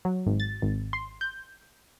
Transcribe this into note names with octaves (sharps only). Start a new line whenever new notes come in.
F#3
G#1
A6
G#1
C6
G6